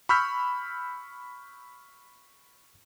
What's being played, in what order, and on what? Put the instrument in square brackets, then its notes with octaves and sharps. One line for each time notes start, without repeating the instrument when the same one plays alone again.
[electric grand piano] B5 C#6 E6 F6 G6 B6